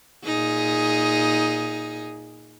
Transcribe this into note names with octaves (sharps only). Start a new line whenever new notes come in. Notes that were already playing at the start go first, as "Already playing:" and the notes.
A#2 D#4 G#4